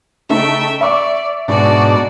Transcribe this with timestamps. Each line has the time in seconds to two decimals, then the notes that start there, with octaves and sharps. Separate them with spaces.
0.30 C#3 A3 D#4 E5 G5
0.81 D5 E5 C#6 D6
1.48 G#2 B2 D4 F#4 D5